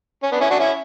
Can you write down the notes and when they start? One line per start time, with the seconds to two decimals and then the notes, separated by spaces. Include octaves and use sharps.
0.23 C#4
0.32 B3 D4
0.40 C#4 E4
0.50 D4 F#4
0.59 C#4 E4